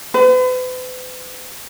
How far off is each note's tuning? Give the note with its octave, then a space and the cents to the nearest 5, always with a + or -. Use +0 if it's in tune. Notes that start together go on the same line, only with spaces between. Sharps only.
B4 +45